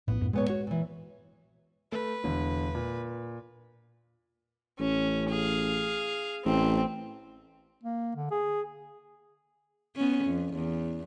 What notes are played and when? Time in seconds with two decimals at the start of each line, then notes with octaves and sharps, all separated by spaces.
0.08 A#1 A2 B3
0.21 C2 F#2 A2
0.33 A#2 G#3 B3 C#5
0.47 F#4 C#5
0.67 A#2 E3
1.92 A3 B4
2.24 E1 D3
2.75 A#2
4.79 A1 C#4
5.30 G#4 F5
6.45 A1 C4
7.83 A#3
8.16 D3
8.31 G#4
9.96 B3 C#4
10.25 F2
10.54 E2